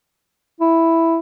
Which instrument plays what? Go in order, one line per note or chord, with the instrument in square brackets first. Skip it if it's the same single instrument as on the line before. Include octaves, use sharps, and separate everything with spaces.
[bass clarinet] E4